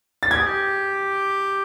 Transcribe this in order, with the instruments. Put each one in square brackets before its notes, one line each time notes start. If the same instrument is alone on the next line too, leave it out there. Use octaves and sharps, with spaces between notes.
[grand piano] A6
[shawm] G4 [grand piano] G#6
[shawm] G#4
G4